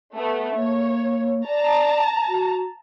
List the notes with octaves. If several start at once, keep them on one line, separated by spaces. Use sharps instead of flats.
A3 B3
A#3 C#5
D5 A5 A#5
F#4